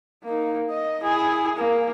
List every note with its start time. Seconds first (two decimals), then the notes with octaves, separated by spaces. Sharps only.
0.23 A#3 D#4
0.69 D#5
1.02 E4 G#4
1.56 A#3